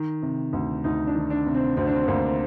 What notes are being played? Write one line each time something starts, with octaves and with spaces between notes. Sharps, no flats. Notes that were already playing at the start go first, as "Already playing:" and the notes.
Already playing: D#3
C3
D2
D2 D#4
D4
D#3
D4
C3
C4
D2 C4
D4
C4
D2 A#3